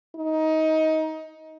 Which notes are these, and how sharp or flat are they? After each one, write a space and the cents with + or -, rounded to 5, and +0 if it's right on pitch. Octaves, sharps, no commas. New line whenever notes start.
D#4 +20